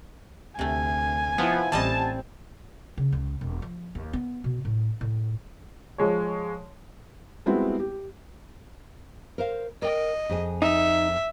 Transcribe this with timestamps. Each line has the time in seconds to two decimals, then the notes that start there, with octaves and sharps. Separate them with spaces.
0.59 D2 C3 A3 G#5
1.38 F3 B3 E4 F4
1.72 A1 E3 G3 C4 D#5 A5
2.98 C#3
3.12 C#2
3.41 E1
3.62 F3
3.95 D#2
4.13 B3
4.44 B2
4.65 A2
5.01 A2
5.98 F3 G#3 C#5
7.46 G3 G#3 B3 C4 E4 F#4
7.80 G4
9.38 A#4 C5 F5
9.82 A#4 D#5 G5
10.29 F2 G#4 G#5
10.62 D#4 E5